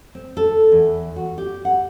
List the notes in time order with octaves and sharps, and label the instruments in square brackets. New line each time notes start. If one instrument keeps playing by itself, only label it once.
[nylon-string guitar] C4
A4
E2
F#4
G4
F#5